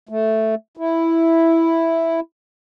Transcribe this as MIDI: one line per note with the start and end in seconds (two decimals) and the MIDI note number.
0.09 0.55 57
0.77 2.20 64